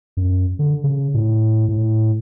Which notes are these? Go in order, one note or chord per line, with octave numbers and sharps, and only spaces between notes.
F#2
D3
C#3
A2
A2